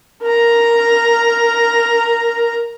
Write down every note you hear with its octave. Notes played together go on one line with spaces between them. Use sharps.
A#4 A#5